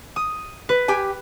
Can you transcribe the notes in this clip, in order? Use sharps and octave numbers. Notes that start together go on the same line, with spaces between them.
D#6
B4
G4 G5 G#5